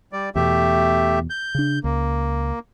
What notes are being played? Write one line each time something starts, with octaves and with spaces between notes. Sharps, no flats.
G3 D5
E2 B2 A3 G4 E5
G6
C#3 D4
C#2 A#3